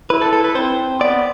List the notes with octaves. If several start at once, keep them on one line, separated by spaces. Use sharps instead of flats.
E4 B4
A4
A4
B4
C4 C5
B3 D5